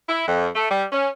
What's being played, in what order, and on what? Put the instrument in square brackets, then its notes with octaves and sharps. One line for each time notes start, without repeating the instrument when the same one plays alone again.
[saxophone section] E4
F2
A3
G3
C#4